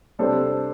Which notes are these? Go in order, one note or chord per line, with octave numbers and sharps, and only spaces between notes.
C3 G3 D4 A4 C5